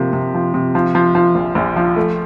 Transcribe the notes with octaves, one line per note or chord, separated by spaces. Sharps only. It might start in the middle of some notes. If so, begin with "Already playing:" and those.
Already playing: C3 F3 A#3
C3
F3
C3
F3
F3
F3
A#1
A#1
F3
A3